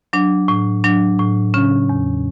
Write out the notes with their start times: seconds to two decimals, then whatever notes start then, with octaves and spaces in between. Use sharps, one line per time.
0.13 F#3 D4
0.48 A2
0.84 F#3 D4
1.19 A2
1.54 C#3 C#4
1.89 E2